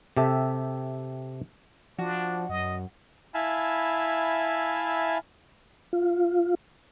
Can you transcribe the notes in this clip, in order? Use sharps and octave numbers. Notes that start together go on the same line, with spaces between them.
C3 G4 A4 E5
F3 D4 F#4
F#2 D#5
E4 E5 F5 G#5 A5 B5
F4